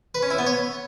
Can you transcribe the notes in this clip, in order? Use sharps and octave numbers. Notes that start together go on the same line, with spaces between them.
B4
C#4
E4
B3
C#5